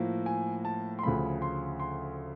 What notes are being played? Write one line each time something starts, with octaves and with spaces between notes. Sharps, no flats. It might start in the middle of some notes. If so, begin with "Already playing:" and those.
Already playing: A2 F3 A#3
G#5
A5
C6
D2 C#3 F3 A3 B5
C6
C6